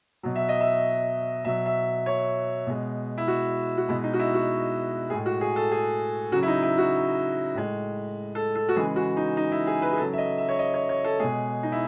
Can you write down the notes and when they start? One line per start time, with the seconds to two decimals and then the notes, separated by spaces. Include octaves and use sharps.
0.23 B2 F#3
0.36 E5
0.49 D#5
0.61 E5
1.45 B2 F#3 E5
1.66 E5
2.06 C#5
2.67 B2 G#3
3.18 E4
3.28 F#4
3.77 F#4
3.89 B2 G#3 E4
4.04 D#4
4.13 F#4
4.19 E4
4.34 F#4
5.10 A2 G#3 G#4
5.26 F#4
5.41 G#4
5.56 A4
5.72 G#4
6.32 C#3 F#3 F#4
6.43 E4
6.48 D#4
6.63 E4
6.78 F#4
7.54 A2 G#3
8.35 A4
8.55 A4
8.69 F#4
8.76 C#3 E3 G#3 G#4
8.96 F#4
9.17 D#4
9.37 D#4
9.52 E4
9.67 G#4
9.82 B4
9.92 G#4
9.98 C#3 F#3 A4
10.13 E5
10.18 D#5
10.38 E5
10.49 C#5
10.59 D#5
10.74 C#5
10.89 C#5
11.04 A4
11.20 B2 G#3 G#4
11.63 D#4
11.72 E4